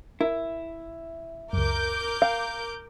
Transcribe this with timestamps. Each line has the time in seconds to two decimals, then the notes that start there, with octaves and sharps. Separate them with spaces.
0.21 E4 A#4
1.53 C#2 F#2 A#4 D6 G6
2.22 F5